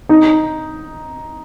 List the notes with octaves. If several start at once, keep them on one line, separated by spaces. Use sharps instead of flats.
D#4